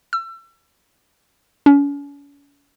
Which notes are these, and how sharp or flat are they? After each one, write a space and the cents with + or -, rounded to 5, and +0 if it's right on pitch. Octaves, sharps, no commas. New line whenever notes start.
E6 +35
C#4 +40